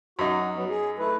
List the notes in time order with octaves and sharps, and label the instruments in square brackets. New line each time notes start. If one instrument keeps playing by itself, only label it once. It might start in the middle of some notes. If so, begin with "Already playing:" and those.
[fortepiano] F#2 D#4 [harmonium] F#4
[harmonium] F#3 B3
G#4
A3 E4 B4